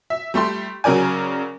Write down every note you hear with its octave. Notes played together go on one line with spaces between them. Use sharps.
E5
G3 A3 G4 C6
C#3 F#3 A#4 D5 G#5